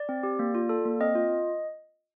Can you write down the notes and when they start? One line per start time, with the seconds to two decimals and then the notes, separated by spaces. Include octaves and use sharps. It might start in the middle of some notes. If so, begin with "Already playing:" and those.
Already playing: D5
0.09 C4
0.23 G4
0.39 A#3
0.55 F4
0.69 A4
0.85 A#3
1.00 C4 D#5
1.15 F4